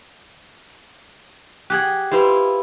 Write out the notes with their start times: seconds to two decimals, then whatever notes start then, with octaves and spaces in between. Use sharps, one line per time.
1.70 G4 G#4 F#5 F#6 G#6
2.12 E4 F4 G4 B4 C5